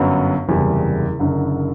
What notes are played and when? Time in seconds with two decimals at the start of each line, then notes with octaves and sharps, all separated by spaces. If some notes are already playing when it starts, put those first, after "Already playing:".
Already playing: G1 F#2 F#3 B3 F#4
0.48 F#1 E2 C3 G3
1.19 F#1 F#2 D3